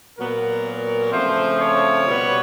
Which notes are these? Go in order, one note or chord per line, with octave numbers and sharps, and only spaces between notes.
A#2 F#3 B3 A#4
C#3 F3 A3 C4 C5
C#5
B2 G3 B3